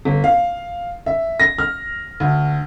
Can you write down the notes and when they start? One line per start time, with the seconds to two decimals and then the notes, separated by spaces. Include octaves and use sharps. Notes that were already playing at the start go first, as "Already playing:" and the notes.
0.05 G1
0.24 F5
1.06 E5
1.40 A#6
1.58 F6
2.20 D2